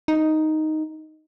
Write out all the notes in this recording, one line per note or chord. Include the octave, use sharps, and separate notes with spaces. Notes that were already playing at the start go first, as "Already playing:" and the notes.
D#4